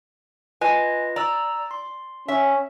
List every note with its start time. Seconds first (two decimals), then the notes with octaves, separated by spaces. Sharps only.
0.61 F4 B4 D#5 G#5
1.16 D5 A#5 E6
1.71 C6
2.28 C#4 E5